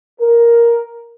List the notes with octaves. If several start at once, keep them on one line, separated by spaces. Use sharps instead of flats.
A#4